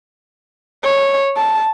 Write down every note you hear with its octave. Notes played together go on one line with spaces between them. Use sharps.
C#5
A5